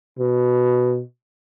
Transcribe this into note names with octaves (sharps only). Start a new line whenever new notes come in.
B2